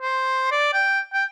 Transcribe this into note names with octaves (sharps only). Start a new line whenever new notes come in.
C5
D5
G5
G5